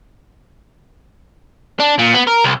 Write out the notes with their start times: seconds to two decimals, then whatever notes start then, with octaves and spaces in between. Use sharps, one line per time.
1.80 D4
1.99 A#2
2.15 B3
2.27 A#4
2.44 C2